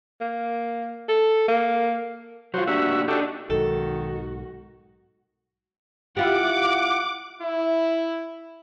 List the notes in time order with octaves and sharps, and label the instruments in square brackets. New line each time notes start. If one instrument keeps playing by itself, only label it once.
[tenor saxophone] A#3
A4
A#3
[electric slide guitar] F#3 F4 [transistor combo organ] F#4 C5
[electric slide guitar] A#3 D4 G4 [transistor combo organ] F#4 E5
[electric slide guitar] D4 D#4 [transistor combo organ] F#4 G4 A4
[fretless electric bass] B1 G#2 [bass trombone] D#3 [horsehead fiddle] F#4 [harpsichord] A4
[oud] E4 F4 G4 [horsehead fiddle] F#5 [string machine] D6
[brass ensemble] E4